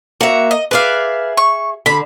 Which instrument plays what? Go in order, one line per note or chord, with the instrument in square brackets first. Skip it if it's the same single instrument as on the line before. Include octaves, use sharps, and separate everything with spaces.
[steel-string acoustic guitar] A#3 E5 [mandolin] F#4
[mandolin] D#5
[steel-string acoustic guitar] G#4 E5 [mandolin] B4 D5 F5
[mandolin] C#6
[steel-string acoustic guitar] D3 [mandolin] B5